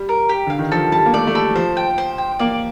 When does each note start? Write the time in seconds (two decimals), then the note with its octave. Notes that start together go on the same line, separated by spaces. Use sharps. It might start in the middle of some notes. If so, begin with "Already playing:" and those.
Already playing: G3
0.09 A#4
0.29 G4
0.47 D3 F5
0.59 D#3
0.72 F3 A4
0.92 G3 A5
1.06 A#3
1.13 A3 D5
1.27 A3
1.35 G3 A4
1.51 G3
1.55 F3 C5
1.77 G5
1.98 C5
2.18 G5
2.39 A#3 D5